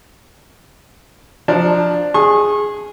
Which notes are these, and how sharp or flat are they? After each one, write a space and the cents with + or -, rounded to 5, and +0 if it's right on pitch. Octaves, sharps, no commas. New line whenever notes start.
F3 +5 D4 +5 A#5 +0
G#4 +0 C#6 -40